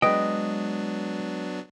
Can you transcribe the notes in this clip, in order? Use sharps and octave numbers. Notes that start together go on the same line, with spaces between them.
F#3 G#3 B3 D4 B4 D#5 G5